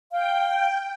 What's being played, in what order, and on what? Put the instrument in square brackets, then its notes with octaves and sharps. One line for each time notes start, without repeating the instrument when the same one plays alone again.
[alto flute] F5 [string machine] G5